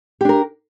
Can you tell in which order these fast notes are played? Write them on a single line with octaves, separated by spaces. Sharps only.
G4 D4 A#4